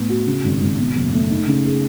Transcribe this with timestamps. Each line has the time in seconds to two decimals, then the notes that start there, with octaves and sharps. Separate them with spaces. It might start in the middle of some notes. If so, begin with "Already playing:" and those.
Already playing: A2 B3
0.09 F#4
0.26 C#3
0.44 G#1
0.61 G#1
0.79 B2
0.96 F#1
1.14 A3
1.31 D#4
1.47 C#3
1.65 G#4